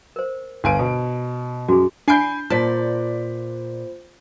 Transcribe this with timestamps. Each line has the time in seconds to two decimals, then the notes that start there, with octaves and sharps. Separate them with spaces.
0.16 A#4 C5
0.64 G1 G#5 D7
0.79 B2
1.68 F#2 F#4 G#4
2.08 D4 G#5 B5 G6 C7 D7
2.50 A#2 F4 C5 D5 A5 B6